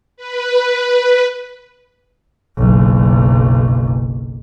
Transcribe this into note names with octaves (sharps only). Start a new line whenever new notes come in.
B4
F#1 B1